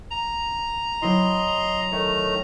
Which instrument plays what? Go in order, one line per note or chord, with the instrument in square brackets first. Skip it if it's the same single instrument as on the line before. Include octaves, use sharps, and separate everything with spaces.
[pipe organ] A#5
[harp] F#3 C4 E4 [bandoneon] D#5 C6
[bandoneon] D#3 A3 [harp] C#5